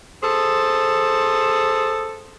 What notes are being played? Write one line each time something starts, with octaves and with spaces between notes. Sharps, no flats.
G#4 A4 C5